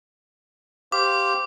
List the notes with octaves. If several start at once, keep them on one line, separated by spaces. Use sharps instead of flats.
G4 C5 F5 D6